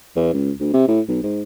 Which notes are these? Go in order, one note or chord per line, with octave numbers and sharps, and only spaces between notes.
E2
C#2
D2
C3
A2
B1
G#2